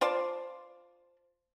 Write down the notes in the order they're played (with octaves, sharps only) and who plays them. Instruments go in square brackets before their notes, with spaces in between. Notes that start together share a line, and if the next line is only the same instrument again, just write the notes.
[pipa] F4 C5 D5 A5